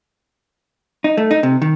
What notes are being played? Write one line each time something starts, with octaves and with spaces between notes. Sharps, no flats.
D#4
A3
D#4
C3
D#3